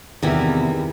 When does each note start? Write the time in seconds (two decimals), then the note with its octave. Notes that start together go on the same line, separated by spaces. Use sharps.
0.22 E2 C3 D#3 G3 E4